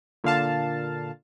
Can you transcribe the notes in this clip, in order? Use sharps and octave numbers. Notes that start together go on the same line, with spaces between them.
A#2 D3 F5 A5